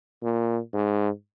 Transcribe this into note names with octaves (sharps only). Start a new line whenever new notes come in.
A#2
G#2